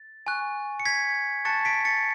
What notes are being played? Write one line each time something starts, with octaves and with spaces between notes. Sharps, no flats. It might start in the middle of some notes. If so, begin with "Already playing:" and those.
Already playing: A6
G#5 C#6 F#6
C#7
G#6 B6
A5 C#6 F#6 A6 C#7
B6 D7
A6 C#7